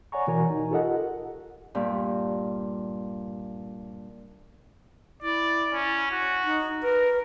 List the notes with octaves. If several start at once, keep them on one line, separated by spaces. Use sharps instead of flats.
C#5 D5 F#5 G#5 A#5 C#6
B2 E3 F#4 A#4 G#5 A#5
D#4
F4 G4 A4 A#4 D#5 F#5
G2 A#2
E4 D5
C#4
F#4
D#4
A#4 B4